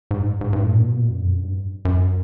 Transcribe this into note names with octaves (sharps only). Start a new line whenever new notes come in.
G#2
G2
G#2
G#2
G2
A2
A#2
B2
A#2
F#2
F2
F#2
G2
F#2